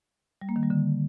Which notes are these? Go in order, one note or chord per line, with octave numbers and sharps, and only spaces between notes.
G3
A#3
D#3
G3
D3